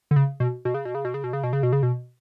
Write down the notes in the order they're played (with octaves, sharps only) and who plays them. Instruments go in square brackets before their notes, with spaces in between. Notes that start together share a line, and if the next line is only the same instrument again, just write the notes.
[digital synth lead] D3
C#3
B2
B2
C#3
B2
C#3
B2
C#3
B2
C#3
B2
C#3
B2
C#3
B2